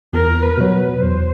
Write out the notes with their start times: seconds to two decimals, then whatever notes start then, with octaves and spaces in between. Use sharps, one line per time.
0.13 E2 A#4
0.42 B4
0.58 B2 F#3
0.73 B4
1.02 E2 C5